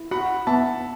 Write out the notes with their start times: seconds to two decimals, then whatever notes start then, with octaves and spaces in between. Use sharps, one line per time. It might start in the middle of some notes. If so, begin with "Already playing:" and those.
Already playing: E4
0.11 F#4 F#5 B5
0.47 B3 E5 A5